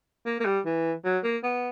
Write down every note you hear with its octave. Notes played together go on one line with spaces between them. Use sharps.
A#3
A#3
G3
E3
F#3
A#3
B3